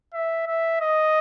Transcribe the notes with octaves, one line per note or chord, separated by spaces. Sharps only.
E5
E5
D#5